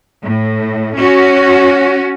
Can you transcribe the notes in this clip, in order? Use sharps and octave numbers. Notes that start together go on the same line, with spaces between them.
A2
C#4 F#4